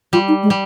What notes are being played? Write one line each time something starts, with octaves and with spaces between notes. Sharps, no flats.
G3 F4
D#4
G#3
G3